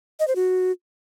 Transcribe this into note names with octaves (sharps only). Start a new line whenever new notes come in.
D#5
C5
F#4